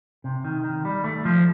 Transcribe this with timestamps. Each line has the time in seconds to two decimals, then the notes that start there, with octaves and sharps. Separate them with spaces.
0.24 C3
0.45 D#3
0.64 D#3
0.85 G3
1.04 A3
1.25 F3